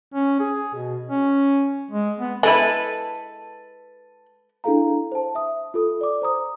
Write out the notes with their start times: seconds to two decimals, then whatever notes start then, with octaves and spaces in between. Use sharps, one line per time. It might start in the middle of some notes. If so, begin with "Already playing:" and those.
0.14 C#4
0.40 G#4
0.75 B2
1.09 C#4
1.91 G#3
2.20 B3
2.43 G#3 E4 A4 B4
4.64 D4 E4 G#4 A4 F5 A#5
5.12 C5 A5
5.35 E5 D#6
5.74 F4 A4 D#6
6.01 D5 D6
6.22 C5 A#5 D#6